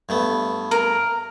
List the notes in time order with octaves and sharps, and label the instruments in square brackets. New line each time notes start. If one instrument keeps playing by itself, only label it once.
[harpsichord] G2 A3 B3
[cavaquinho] A#4